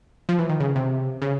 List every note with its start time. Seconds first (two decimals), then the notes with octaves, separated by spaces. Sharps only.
0.29 F3
0.39 E3
0.49 D#3
0.60 C#3
0.76 C3
1.22 C#3